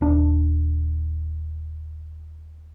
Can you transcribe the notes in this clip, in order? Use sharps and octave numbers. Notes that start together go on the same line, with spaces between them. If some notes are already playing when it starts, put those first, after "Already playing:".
D#1 D4